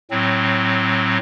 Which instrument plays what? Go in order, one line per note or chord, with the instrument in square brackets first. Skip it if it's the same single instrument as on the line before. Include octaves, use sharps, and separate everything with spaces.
[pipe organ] A2 F#3 C4